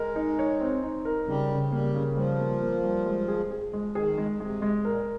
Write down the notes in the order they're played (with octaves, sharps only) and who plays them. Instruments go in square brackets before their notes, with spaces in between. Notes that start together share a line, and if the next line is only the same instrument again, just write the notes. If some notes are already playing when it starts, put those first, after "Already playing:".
Already playing: [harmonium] G#3 [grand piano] A#4
[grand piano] D#4
C#5
C4
D#4
A#4
[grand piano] C#3 [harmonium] G3
[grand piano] C#3
[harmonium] G3 [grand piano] A#3
[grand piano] C#3
[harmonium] F3 [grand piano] G3
[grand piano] A#3
A#3
G3
G#3
G#4
G#4
G#3
[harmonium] D#3 [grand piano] G#4
[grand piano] G#3
[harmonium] C3 [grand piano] G#3
[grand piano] G#3
[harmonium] A#2 [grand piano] A#4